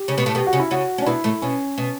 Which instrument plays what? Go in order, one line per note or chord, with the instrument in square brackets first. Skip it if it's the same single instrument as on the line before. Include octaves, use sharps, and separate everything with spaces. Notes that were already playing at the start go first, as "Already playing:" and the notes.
Already playing: [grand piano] G4
[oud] C#3 C#4
B2 B3
A2 A3
[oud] B2 B3 [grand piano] G4
[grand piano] F#4
[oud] C#3 C#4
[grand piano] E4
[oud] C#3 C#4 [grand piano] F#4
[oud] C#4 [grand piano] D4
[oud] B2 B3 [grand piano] E4
[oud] A2 A3
[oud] B2 [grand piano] C#4
[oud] B2